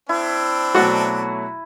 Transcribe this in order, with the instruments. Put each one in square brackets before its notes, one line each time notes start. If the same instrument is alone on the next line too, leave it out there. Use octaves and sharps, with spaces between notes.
[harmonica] C4 D4 [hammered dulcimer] E4
[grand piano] B2 F#3 A3 [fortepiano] F#4 D5 F#5